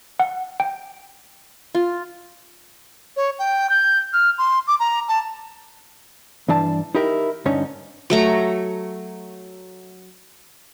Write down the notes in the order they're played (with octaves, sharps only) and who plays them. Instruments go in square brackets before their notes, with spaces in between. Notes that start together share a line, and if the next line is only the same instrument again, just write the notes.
[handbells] F#5
G5
[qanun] F4
[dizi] C#5
G5
G6
F6
C6
D6
A#5
A5
[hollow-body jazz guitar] G2 E3 D4 A5
D#4 E4 G4 A#4
D2 G2 D3 C#4 D#4 C#5
[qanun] F#3 A3 A#5